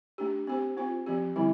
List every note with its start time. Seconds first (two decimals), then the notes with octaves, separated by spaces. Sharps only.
0.18 A3 D4 G4
0.47 C4 G4 C5
0.77 C4 F4 C5
1.06 F3 C4 G4
1.36 D3 G3 C4 E4